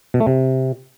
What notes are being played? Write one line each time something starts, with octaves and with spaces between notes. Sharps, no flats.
B2
A3
C3